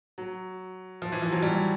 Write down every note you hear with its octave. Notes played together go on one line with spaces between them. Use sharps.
F#3
F3
E3
F3
F#3
G3